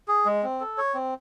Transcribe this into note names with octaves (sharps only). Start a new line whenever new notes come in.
G#4
G#3
C4
A4
C#5
C4